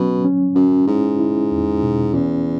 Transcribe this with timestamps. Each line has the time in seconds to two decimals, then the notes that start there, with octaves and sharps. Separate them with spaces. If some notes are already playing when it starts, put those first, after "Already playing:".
Already playing: B2 F#3 C#4
0.25 C#4
0.55 F#2 C#4
0.87 G#2 E4
1.19 E4
1.52 E2
1.83 B2
2.14 E2 C#4